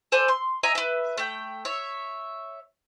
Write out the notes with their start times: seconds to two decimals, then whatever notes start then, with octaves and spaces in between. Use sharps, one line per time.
0.12 A4 C5 D5 G#5
0.28 C6
0.63 D#5 E5 G#5 A#5
0.75 B4 E5
1.17 A3 G5
1.65 C#5 E5